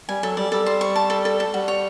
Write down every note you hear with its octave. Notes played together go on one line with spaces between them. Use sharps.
G3 G#5
F#3 A4
G3 D5
G3 A4
C5
C#6
A5
A4
A4
A4
G3 F#4
C#5